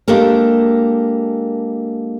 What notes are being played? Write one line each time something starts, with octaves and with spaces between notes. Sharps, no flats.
G#3 A#3 D4 G4 A4 A#4